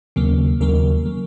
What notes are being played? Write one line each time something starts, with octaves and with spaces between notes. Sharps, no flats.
D#2 C#3 F#3 A#3
D#2 C#3 F#3 A#3 A#4
C#3 F#3 A#3